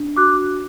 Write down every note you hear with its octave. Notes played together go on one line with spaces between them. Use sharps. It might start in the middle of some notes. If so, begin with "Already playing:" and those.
Already playing: D4
F#4 D6 F#6